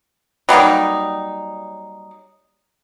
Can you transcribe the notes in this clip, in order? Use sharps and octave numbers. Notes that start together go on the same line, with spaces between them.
F#3 G3 A#3 D#4